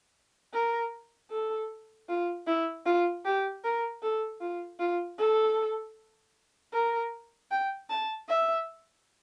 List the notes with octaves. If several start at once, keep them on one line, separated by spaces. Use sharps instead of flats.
A#4
A4
F4
E4
F4
G4
A#4
A4
F4
F4
A4
A#4
G5
A5
E5